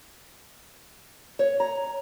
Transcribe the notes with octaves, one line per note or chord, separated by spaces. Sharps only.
C#5
A#5